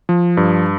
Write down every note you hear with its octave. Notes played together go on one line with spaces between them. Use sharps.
F3
G2